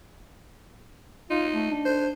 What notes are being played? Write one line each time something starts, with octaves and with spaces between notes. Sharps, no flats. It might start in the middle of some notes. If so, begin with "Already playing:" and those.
D#4 F4
A3
D4
C5